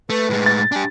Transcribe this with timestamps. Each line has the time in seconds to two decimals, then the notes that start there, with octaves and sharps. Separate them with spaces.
0.10 A3 B4
0.30 A2 G#3
0.46 A6
0.72 D4 G4 G#5